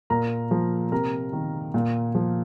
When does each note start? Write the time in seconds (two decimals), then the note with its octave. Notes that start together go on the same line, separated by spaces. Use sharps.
0.10 A#2 A#4 A#5
0.51 F3
0.92 C3 A#4 A#5
1.33 D#3
1.74 A#2
2.15 F3